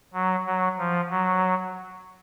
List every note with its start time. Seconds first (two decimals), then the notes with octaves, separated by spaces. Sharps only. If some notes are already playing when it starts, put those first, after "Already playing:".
0.13 F#3
0.46 F#3
0.78 F3
1.10 F#3